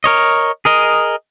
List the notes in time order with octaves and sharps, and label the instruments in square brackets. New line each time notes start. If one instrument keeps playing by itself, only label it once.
[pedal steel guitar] A#4 C#5 D#5
G#4 A#4 D#5